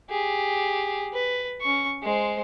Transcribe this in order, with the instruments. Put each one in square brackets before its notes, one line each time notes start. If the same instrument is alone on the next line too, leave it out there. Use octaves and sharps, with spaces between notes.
[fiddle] G4 G#4
B4
C#4 C#6
G#3 C5